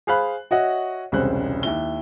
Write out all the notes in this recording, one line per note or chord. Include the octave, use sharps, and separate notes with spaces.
G#4 C5 F5 B5 F#6
F#4 C#5 D#5 E5 F#5
E1 C2 C#3 C#4 C5 F#6
D#2 E4 G7